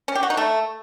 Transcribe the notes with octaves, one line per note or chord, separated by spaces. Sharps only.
C#4
G4
F#4
D#4
A3